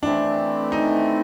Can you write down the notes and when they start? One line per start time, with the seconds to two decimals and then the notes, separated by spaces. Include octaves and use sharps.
0.03 E3 A3 C4 D4 E4
0.72 D#4